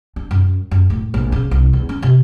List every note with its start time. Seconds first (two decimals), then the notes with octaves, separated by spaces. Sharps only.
0.16 D4
0.31 F#2
0.71 F#2
0.90 A2
1.14 A#1
1.32 C#3
1.51 C2
1.73 E2
1.89 C#4
2.02 C3